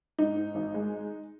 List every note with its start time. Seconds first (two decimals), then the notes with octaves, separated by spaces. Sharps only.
0.19 G#2 D#4
0.36 G#2
0.55 G#1
0.74 G#3